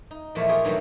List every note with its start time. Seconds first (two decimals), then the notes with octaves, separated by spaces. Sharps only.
0.11 D#4
0.35 E2 A#2 F3 G#3 A3 C#5
0.49 F4 G4 G#4 A#4 C#5
0.64 G2 D#3 E3 F#3 G3 A3